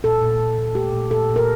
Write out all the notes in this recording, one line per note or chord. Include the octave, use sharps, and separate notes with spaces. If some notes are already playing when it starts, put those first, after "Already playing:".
A#2 A4
A#2
A#2
A#2
A3 G4
A#2
A#2 A4
A#2
A#4